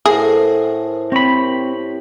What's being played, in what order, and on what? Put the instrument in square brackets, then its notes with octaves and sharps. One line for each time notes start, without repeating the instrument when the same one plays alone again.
[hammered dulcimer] A2 F#5 [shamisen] G#4 [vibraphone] A#4 C5
[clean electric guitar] C4 B5 [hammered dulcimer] G4 C#5